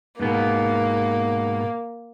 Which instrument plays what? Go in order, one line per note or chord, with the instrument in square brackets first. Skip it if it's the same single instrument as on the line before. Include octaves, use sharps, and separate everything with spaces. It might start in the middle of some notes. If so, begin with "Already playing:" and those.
[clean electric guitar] G#2 B2 B3 [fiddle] A#3